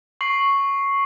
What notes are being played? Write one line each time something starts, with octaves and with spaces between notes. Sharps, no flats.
C#6 C7 F#7